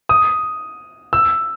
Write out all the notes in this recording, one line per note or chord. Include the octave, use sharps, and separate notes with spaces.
D#6
E6